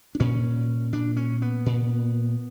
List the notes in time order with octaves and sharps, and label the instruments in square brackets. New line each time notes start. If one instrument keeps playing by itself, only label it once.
[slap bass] D4
A#2 C#4
A#2 D4
C#4
B3
A#2